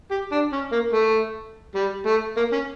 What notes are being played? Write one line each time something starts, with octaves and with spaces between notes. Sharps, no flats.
G4
D4
C#4
A#3
A3
G3
A3
A#3
C#4